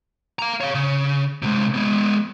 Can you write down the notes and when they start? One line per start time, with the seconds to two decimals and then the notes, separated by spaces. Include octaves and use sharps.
0.39 F5 A#5
0.61 C#5 F5
0.74 C#3
1.43 C3 G#3
1.74 G#3 B3